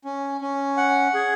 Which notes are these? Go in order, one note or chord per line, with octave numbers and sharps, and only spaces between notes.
C#4
C#4
F#5
G#4